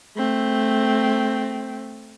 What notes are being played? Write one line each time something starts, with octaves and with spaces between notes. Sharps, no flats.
A3 C4